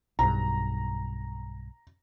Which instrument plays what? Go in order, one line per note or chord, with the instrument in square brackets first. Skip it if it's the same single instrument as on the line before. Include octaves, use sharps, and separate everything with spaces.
[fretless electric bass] B1 G2 [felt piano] A#5